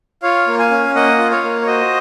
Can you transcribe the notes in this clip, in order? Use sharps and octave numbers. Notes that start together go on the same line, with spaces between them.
F4 C#5 F5
A#3
F5 G#5
C#4
A#3 D#5 F#5
F4
C#5 F5
A#3
C#5
F#4 C5 D#5